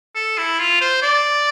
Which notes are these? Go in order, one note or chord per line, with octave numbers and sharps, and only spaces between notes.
A4
E4
F4
C5
D5